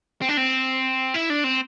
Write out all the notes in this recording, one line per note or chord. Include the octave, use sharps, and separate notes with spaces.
C4
D4
C4
E4
D4
C4